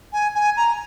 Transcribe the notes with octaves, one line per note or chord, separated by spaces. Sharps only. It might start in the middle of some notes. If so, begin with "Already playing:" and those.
G#5
G#5
A#5